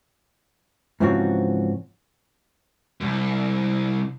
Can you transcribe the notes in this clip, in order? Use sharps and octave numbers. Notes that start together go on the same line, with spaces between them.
G#2 C#3 E3 F3 C4 F#4
C2 F#2